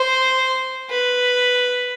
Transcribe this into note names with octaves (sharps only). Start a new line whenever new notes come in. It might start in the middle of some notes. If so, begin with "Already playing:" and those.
Already playing: C5
B4